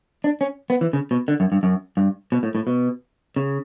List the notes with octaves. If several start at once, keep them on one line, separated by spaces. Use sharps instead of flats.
D4
C#4
B3
E3
C#3
B2
D3
F#2
G2
F#2
G2
B2
A2
A2
B2
C#3